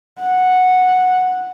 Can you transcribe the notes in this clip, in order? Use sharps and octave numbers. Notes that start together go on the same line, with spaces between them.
F#5